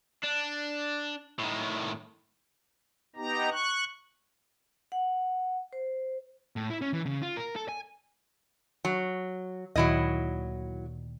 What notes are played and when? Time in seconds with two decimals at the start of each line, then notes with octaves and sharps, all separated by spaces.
0.24 D4
1.39 A2 D#3
3.16 B3 D#4 G4 A#5
3.52 C#6 F#6
4.92 F#5
5.73 C5
6.56 A2
6.70 E4
6.81 C#4
6.93 E3
7.06 C#3
7.22 F4
7.37 A#4
7.56 A4
7.69 G#5
8.85 F#3
9.76 D2 A#2 D#3 F#3 E4 D#5